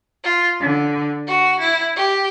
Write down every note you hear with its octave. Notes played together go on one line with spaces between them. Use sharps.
F4
D3
F#4
E4
G4